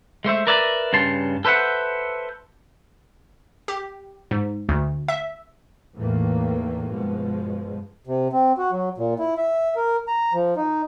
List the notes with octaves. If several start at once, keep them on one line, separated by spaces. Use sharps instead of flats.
G#3 A3 C5 E5
A#4 B4 D5 E5 G#5 A#5
G2 C#3 A5 C6
A4 B4 C5 E5 F#5
G4
G#2
D2
E5
E2 A2 D#3 E3 A3 A#3
G2 B2 F3 G#3
C3
C4
F#4
F#3
A#2
E4
E5
A#4
A#5
F3
D#4